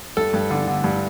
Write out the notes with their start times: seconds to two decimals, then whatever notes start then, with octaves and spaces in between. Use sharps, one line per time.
0.17 G2 A4
0.33 G2
0.51 D3
0.67 D3
0.84 G2